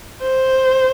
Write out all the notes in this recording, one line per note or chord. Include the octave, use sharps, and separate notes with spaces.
C5